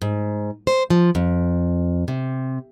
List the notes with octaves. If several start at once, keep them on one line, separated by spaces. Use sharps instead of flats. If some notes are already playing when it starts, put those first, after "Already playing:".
G#2
C5
F3
F2
C3